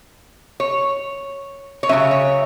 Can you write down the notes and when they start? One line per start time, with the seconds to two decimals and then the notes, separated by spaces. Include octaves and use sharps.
0.60 C#5
1.83 C#5
1.89 C#3 F#3 C#4 E5
2.11 C#5